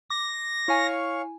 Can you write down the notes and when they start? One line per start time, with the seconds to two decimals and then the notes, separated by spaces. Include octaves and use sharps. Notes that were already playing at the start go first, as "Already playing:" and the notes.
0.10 D6 A#6
0.68 E4 C#5 F5 G#5 C#6